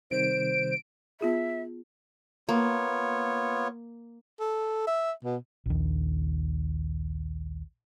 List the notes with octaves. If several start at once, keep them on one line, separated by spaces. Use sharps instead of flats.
C3 D#3 G3 C5 D7
B3 F4 G#4 E5
A#3 B3 F4 C#5
A4
E5
B2
A#1 D#2